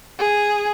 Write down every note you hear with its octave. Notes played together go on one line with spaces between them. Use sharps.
G#4